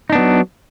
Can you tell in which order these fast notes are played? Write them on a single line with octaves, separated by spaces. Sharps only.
D#4 D4 B3 F#3